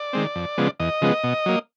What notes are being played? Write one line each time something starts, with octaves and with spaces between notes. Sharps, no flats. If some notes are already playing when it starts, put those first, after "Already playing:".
Already playing: D5
D#3 G#3 C4
F2
C#3 F3 G#3 B3
E2 D#5
C#3 F3 G#3 B3
B2
F#3 A#3